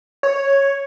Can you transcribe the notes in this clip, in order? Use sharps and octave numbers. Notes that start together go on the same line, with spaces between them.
C#5